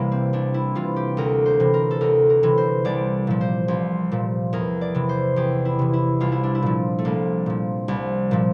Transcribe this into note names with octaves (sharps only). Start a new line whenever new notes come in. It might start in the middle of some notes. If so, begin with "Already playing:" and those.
Already playing: C2 C3 E3 A#3 E4
C4
C2 D4
E4
C3 E3 F4
G4
D2 A#4
C5
C3 E3
A#4
A4
D2 A#4
A#4
C3 E3
C5
C2 D5
A#2 F3
C5
C2 C5
A#2 F3
E2 A#4
D5
C3 E3
C5
E2 G4
E4
C3 E3
E4
C2 F4
E4
D4
E4
A#2 F3
A3
C2 A#3
A#2 F3
C2
A#2 F3